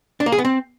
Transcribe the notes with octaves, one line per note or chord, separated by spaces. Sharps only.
D4
A#3
G#4
B3
C4